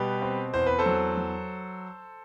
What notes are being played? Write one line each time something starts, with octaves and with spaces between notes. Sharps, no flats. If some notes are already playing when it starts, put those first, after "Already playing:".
Already playing: B2 G3 G4 B4
C4
E2 C5
B4
A4 C5
F#3
F#3